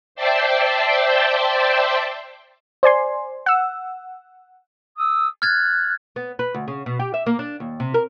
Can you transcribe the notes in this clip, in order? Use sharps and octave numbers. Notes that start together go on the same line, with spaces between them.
C5 D5 E5 G5 A5 C6
C5 D5 G#5 C6
F#5 E6
D#6 E6
F6 F#6 G#6 A6
B3
B4
D2
C#3
B2
G4
E5
A#3
D4
D#2
C3
A#4